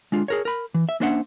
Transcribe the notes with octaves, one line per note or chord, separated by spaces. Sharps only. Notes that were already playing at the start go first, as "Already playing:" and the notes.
G#3 D4 F4
G#4 A#4 C#5
A#4 B5
E3
E5
A#3 C#4 D4 C5 E5 F#5